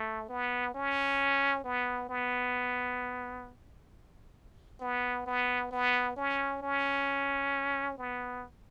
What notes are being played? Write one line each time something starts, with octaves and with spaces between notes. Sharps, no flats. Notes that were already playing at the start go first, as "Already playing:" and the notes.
Already playing: A3
B3
C#4
B3
B3
B3
B3
B3
C#4
C#4
B3